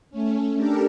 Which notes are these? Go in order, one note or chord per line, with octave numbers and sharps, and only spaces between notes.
A3 C#4
D4 G4 A4 A#4